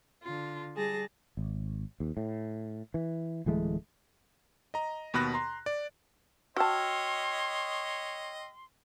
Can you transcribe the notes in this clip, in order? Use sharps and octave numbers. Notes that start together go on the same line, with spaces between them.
D3 F4
G3 G#4 A5 A#6
G#1
D#2
A2
E3
D1 E3 G#3 A3
D#5 A#5
D#2 B2 B5 F#6 A#6
A#5 C6
D5
F#4 C#5 D#5 G5 A5 C6 E6 F6